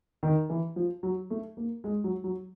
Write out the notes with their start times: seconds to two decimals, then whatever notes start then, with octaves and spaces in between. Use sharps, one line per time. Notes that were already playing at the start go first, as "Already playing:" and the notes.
0.23 D#3
0.50 E3
0.76 F3
1.03 F#3
1.30 A3
1.57 A#3
1.84 G#3
2.04 F#3
2.24 F#3